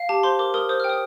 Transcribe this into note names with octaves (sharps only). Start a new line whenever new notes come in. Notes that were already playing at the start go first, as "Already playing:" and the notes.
Already playing: F5
G4 A5
C5 C6
A#4 D6
A#4 D#6
C5 D#6
G5 F6
D#6